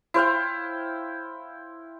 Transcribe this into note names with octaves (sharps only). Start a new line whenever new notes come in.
E4 C5 F5 G5